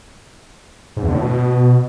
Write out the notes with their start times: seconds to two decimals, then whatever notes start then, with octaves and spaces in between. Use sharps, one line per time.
0.97 G#2
1.03 E2
1.09 D3
1.15 A2
1.20 B2